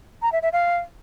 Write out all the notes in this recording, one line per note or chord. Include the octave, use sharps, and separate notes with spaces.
A#5
E5
E5
F5